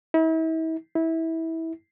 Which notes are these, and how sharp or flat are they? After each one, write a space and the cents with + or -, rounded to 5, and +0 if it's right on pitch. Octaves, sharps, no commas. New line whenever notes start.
E4 -40
E4 -20